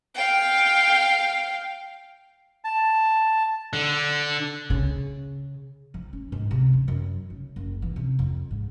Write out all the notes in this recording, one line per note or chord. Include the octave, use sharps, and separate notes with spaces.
F5 G5
A5
D3
C#3
F3
C#4
G#2
C3
E3
F#2
C#3
F#1
E3
C3
F2
G#2